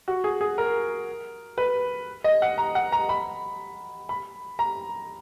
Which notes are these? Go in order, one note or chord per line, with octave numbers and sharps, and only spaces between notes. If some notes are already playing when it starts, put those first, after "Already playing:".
F#4
G#4
G#4
A#4
B4
D#5
F#5
A#5
F#5
A#5
B5
B5
A#5